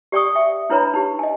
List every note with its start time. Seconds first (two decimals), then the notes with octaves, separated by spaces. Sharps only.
0.12 G4 D5 G5 C#6 D#6
0.35 E5 G5
0.70 D4 E4 B4 C#5 A#5 B5
0.94 D#4 G4
1.19 D#5 G#5